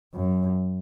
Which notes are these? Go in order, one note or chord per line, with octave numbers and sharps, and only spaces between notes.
F#2